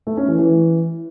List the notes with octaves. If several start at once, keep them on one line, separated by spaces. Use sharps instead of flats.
A3
C#4
E3
E3